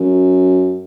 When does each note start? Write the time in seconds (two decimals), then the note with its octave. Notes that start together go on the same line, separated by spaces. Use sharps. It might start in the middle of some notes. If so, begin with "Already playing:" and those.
Already playing: F#2